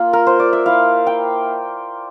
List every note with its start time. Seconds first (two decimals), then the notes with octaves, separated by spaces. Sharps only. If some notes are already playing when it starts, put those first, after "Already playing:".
Already playing: A#3 F4
0.13 A#4
0.27 C5
0.40 D5
0.53 E5
0.66 A#3 E4 F5
1.07 G5